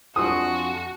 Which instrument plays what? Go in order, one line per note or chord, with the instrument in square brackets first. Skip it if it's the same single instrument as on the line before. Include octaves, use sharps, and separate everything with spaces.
[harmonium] F2 D4 F4 [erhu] F#4 [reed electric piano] G#5 C6 C#6 [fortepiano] D#6